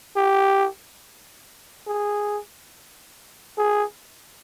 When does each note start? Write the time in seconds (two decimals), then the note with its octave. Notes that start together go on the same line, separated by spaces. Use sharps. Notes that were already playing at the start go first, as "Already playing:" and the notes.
0.16 G4
1.87 G#4
3.58 G#4